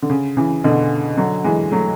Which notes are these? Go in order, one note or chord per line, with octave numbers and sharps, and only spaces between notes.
D3
C#3
C#3 E3
B2 D3
D3 F#3
E3 G#3
F#3 A3